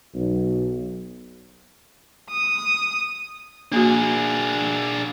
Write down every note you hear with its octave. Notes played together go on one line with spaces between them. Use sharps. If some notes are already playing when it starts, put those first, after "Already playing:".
B1
D#6
A#3 D4 F#4 G#4